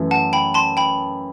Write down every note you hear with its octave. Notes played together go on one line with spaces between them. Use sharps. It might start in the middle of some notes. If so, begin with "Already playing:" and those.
Already playing: F#2 E3 A3
F#5 A5
G5 B5
A5 C6
G5 B5